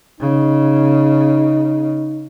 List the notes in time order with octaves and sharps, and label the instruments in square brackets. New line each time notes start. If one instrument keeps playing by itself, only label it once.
[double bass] C#3 [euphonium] D#4